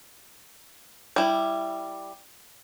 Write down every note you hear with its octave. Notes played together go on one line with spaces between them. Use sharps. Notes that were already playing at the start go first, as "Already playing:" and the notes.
G3 E4